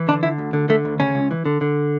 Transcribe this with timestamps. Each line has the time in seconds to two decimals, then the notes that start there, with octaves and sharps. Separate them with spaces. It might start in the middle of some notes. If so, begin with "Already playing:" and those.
Already playing: E3
0.08 D3 D4
0.23 D3 E4
0.38 D2
0.53 D3
0.69 D3 A3
0.85 D2
1.00 C#3 C#4
1.15 C#2
1.31 E3
1.45 D3
1.61 D3